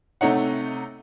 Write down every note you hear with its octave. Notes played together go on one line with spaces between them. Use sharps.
C3 A3 D#4 C#5 F#5